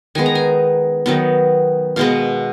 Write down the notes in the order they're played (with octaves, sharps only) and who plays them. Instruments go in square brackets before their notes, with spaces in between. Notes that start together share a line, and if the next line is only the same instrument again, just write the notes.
[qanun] D#3 G#3 B3 G#5
A#5
G#5
D#3 F#3 B3
B2 G#3 B3 F5